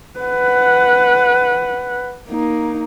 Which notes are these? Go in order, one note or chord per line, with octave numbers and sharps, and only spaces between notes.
B4 F#5
A#3 D#4